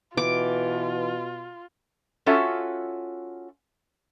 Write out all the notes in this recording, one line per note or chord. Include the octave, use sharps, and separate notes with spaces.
B2 E3 F4 D6
C#4 F4 F#4 A4 C#5 E5